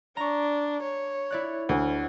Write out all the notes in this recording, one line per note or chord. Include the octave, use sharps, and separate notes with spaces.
D4 A#5 C#6
C#5
E4 D5 F#6
D2